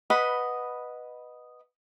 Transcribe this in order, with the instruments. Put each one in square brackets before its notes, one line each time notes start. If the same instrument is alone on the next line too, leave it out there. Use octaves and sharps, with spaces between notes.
[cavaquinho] B4 D#5 F#5 B5